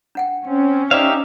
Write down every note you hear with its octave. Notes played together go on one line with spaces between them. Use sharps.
D4 F#5 G5
C4 C#4
D#4 G4 C5 D5 E5 F5 C6